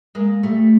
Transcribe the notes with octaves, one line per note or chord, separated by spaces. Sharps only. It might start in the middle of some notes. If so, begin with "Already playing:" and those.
G#3 A#3
G3 A3